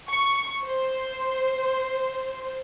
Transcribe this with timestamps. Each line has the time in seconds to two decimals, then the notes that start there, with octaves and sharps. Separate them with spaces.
0.11 C#6
0.66 C5